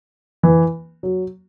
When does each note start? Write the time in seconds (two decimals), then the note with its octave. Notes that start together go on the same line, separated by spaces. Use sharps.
0.43 E3
1.03 F#3